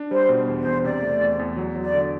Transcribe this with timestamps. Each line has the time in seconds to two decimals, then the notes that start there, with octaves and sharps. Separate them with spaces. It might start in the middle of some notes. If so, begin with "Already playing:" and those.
Already playing: D4
0.11 G3 C5
0.29 B2
0.48 E2
0.60 C5
0.66 E2
0.84 C3 D5
1.02 A3
1.21 E2
1.39 E2
1.57 F#3
1.76 F#3
1.82 D5
1.93 D3